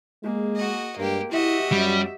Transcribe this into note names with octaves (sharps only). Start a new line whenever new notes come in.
G#3 A#3 G#4
F#4 D#5
G2 G#3 A#3 G4
E4 F#4 G4 D#5 E5
F#2 G3